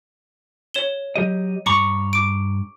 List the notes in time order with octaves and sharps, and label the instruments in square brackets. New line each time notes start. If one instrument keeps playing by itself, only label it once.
[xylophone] C#5 E7 G7
[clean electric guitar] F#3 G4 D#5
[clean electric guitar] G2 A#5 B5 [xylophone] C#6 D6 C#7
[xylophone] D6 D7